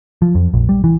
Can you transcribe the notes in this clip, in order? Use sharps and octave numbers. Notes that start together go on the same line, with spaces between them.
F3
F2
A#1
G3
E3